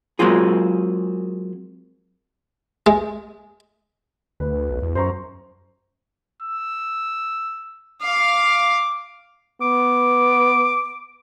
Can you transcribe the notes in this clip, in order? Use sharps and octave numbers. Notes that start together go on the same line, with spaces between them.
F#3 G#3 A#3 C4 F4 G#4
G#3
D2 B4
B1
E2
F#2 C5 A#5 C#6
E6
F5 D6
B3 D6